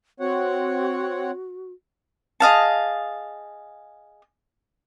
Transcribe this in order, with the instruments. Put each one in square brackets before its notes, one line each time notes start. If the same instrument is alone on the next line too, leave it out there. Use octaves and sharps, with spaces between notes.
[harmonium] C4 C#5 F#5 [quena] F#4
[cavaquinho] G#4 D#5 F5 A5